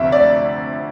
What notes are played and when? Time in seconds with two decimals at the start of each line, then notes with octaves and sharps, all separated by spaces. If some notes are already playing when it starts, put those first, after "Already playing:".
Already playing: D2 C3 F3 E5
0.12 D5